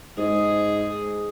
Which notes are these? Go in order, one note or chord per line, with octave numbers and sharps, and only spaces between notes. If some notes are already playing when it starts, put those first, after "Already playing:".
G#2 G#4